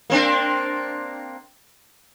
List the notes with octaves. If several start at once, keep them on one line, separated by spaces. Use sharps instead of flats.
A#3 C4 D4